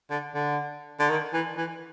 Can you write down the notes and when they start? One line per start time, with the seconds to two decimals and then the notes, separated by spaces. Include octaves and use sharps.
0.10 D3
0.35 D3
0.99 D3
1.09 D#3
1.33 E3
1.57 E3